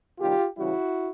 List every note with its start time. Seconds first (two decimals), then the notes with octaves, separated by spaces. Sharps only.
0.19 C3 D#3 G3 F4 G4
0.57 C#3 E3 G3 E4 F#4